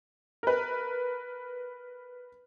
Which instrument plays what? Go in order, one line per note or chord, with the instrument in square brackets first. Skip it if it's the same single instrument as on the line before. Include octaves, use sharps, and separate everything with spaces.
[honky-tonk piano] A#4 B4